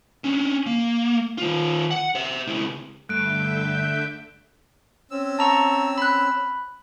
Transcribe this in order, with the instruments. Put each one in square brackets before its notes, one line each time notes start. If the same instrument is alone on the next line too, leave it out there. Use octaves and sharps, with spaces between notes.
[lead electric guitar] C#4 D4
A#3
D#3 F4
F#5
C5 E5
C#2 E4
[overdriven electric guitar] G2 [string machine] D3 E5 G6 [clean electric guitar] A3 [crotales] F#6 D7
[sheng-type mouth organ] C4 C#4 E6
[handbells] A5 A#5 C#6
B5 F#6